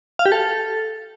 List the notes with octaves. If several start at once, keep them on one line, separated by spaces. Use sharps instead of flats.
F5
G4
A4